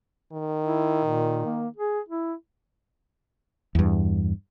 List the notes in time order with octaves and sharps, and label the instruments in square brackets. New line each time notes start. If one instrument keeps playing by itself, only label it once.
[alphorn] D#3
[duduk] E4
A#2
A#3
G#4
E4
[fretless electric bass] E2 G2